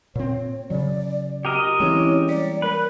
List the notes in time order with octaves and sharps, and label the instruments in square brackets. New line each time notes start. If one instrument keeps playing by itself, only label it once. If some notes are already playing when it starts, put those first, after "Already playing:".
[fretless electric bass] A#2 C4 [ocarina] C#5
[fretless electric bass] C#3 F#3 [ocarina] D5
[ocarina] F#4 [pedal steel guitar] G4 A#4 D#5
[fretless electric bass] E3 G#3 [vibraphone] C4 C#4 E4 [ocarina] C#5
[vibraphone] G3 A#3 C#5 [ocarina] D5
[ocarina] A#4 [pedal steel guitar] B4